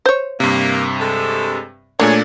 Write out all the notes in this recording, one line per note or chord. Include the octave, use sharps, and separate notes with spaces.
C5 C#5
G2 C3 A#3
G#3 A4
A#2 A3 A#3 D4 G#4 C#5